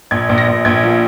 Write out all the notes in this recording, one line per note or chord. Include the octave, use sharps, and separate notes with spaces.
A#1 G#6
A#1
A#6
A#1
A#1 G#6
F3